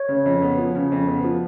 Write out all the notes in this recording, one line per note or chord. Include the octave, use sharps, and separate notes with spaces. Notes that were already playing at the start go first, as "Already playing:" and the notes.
Already playing: C#5
C#3
F2
B3
F3
C#3
F2
B3
F3